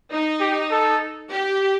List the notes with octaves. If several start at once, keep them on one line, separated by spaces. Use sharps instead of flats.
D#4
G4
A4
G4